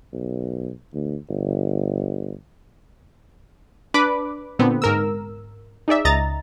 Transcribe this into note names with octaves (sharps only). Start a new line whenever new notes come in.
B1
D2
G1
D4 B4 B5 D6
A#2 D3 B3 C4
G#2 A#4 E6
D#4 G#4 D5 E5
C#2 D#5 A#5 A6